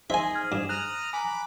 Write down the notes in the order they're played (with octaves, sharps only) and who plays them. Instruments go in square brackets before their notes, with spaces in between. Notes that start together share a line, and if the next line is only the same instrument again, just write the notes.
[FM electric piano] D#4 C5 [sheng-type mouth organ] G#4 [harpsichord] E5 G#5
[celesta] F6 G#6
[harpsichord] G2 [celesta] E7
[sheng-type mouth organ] A#5 D#6 F6 [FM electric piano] F#6
[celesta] G#5 A#5 [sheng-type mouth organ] B5 D6